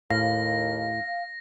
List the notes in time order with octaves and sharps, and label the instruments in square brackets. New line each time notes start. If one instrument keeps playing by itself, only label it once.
[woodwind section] D#2 [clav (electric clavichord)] A2 [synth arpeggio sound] F5 [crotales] A#6